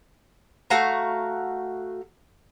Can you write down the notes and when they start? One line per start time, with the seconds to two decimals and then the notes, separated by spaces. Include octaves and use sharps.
0.70 A3 F#4 F5 A#5